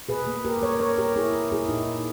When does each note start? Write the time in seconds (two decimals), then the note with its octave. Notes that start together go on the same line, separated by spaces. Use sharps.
0.09 B2 G#4 B4
0.27 A#3
0.45 A#3 G4 A#4
0.62 A#3 A#4 C#5
0.80 A#3 A#4 C#5
0.98 B2 G4 A#4
1.16 B2 E4 G#4
1.34 B2
1.51 A#3 E4 G#4
1.69 A#2 D#4 G4
1.87 A#3